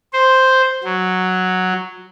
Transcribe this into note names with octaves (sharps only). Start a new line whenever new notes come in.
C5
F#3